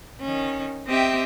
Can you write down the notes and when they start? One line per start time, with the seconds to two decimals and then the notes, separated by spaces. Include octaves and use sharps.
0.20 D#3 C#4
0.88 C4 G4 D#5 E5 G5